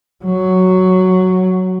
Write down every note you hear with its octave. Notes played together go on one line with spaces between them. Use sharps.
F#3